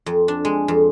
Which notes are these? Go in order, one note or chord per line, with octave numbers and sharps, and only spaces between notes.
F2
D4
G#3
F2